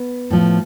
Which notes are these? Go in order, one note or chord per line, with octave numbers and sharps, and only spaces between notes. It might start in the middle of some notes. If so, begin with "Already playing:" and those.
Already playing: B3
A2 F3